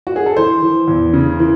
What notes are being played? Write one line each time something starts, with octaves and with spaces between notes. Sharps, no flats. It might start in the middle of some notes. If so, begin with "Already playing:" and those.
F#4
G#4
A4
E3 C5
E3
E2
C#3
E3